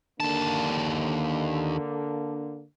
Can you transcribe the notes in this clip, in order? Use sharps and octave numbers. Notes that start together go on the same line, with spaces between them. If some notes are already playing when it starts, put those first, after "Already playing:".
D#2 D3 A#3 D4 A5